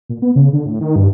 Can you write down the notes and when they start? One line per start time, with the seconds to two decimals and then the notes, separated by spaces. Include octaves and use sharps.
0.09 A#2
0.22 B3
0.36 C#3
0.53 D3
0.66 A2
0.81 D#3
0.96 G2